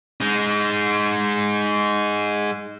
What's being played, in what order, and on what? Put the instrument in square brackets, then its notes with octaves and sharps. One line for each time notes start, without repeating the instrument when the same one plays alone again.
[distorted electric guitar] G#3 D#4